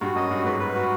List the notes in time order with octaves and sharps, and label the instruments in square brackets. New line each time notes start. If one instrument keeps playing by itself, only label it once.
[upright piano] G2 [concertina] F#4
[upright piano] F#2 [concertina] D#5
[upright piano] G2 [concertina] F#4
[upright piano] G#2 [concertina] B4
[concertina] B4
F#4